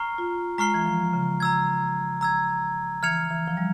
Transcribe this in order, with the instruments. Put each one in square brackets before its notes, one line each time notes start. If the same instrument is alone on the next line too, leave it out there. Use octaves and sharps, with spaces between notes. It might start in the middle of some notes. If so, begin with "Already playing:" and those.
Already playing: [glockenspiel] A#5 C#6 F6 C7 G7
[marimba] F4
[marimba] G#3 [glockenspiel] A#5 C#6 F6 C7 G7
[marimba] E3
F3
C#3
[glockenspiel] A#5 E6 G#6
A#5 E6 G#6
[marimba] E3 [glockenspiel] F6 G#6 C#7 F7
[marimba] E3
F3
G3